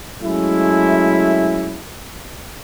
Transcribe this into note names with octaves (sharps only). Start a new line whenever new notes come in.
F#3 G#3 A3 C#4 E4